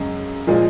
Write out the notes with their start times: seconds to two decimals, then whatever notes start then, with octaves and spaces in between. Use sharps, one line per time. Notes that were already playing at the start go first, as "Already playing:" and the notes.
Already playing: F#2 C#3 G#3
0.47 A#2 F3 G#3